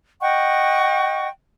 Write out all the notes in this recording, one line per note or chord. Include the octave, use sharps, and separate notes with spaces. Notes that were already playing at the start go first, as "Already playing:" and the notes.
D#5 F#5 G5 C#6